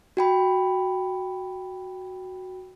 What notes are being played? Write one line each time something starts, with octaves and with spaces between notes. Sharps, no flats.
F#4 G5 B5